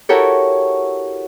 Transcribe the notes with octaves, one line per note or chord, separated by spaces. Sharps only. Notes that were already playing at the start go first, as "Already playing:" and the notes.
E4 F#4 G4 A4 A#4 C#5